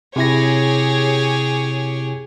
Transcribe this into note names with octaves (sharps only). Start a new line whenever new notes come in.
C3 E4 G4 G#4 C#5 A#6